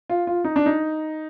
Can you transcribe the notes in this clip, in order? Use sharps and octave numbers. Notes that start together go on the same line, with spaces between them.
F4
F4
D#4
D4
D#4